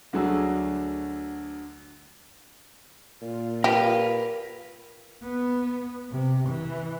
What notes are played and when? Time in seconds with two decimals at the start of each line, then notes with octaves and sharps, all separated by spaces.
0.13 D2 D3 F#3 G#4 E6
3.22 A#2 F4
3.64 G4 A#4 B4 F5
5.23 B3
6.12 C3
6.48 E3